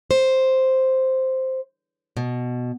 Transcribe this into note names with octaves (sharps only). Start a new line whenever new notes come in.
C5
B2